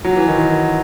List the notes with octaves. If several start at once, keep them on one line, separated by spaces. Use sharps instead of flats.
F#3
E3
D#3